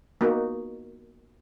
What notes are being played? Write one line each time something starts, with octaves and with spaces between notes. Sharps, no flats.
A#3 B3 D#4 F#4